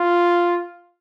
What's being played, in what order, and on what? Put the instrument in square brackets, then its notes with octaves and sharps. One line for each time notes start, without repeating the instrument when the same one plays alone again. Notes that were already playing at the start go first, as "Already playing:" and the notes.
Already playing: [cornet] F4